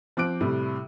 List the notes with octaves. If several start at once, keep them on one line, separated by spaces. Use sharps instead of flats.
F3 C4 D6 F#6 D7
A2 C3 G3